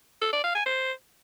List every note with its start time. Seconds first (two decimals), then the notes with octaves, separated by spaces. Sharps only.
0.22 A4
0.33 D5
0.44 F5
0.55 G#5
0.66 C5